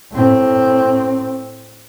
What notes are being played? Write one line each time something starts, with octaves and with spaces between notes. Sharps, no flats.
A2 C4